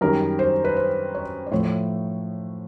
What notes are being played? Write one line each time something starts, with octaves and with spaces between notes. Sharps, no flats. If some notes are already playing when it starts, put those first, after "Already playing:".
F#2 D#3 G3 A#4
C5
B4
C5
C#5
D5
A2 F3 A3 C#5